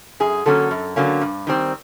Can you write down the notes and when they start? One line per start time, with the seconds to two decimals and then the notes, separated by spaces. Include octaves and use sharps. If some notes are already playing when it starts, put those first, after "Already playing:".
0.20 F#2 G#4
0.45 D3 F#3 A#3 C#4 A4
0.71 F#2
0.96 D3 F#3 A#3 C#4
1.21 G2
1.47 D#3 G3 C4